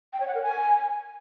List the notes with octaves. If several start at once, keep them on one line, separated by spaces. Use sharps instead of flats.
G5
C#5
F#5
A#4
G#5